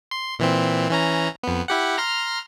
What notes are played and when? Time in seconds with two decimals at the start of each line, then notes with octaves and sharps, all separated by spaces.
0.11 C6
0.39 A#2 E3 C4
0.90 E3 C#4 A#5
1.43 F2 B3
1.68 E4 G4 F#5
1.98 A#5 C6 F6